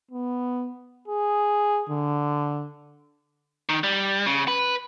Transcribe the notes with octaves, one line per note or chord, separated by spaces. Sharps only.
B3
G#4
D3
D#3
G3
C#3
B4